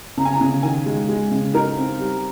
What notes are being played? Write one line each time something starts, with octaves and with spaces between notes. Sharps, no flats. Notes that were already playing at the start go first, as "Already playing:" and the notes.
C#3 A#5
G#5
A#5
C#3
D#3 G#5
G#3
G#3
C#3
D#4 A#4
C4
G3